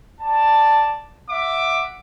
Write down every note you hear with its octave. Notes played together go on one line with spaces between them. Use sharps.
D5 A5
E5 F#5 D6